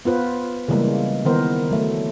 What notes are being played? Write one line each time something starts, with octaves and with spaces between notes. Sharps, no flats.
B3 F4 B4 C5
C#3 E3 G3 G#3 A#3
D#3 E3 B3 A#4 C5
F#3 A3